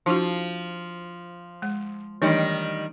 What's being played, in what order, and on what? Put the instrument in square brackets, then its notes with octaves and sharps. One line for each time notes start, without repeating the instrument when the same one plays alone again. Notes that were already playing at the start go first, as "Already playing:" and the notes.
[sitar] F3 [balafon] D4 E4 F#4
[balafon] G#3
[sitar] D#3 G3 [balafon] E3 A3 D4